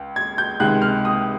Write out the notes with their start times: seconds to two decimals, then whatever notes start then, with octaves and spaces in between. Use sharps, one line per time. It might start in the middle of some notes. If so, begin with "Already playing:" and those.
Already playing: C#2
0.16 G#6
0.38 G6
0.60 C#2 C3 D#3 G#3 F#6
0.82 F6
1.05 D#6